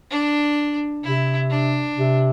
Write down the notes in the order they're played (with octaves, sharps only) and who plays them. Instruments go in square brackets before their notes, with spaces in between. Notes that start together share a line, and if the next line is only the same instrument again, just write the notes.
[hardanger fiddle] D4
[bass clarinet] C3 [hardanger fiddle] E4
[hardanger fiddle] D4
[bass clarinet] C3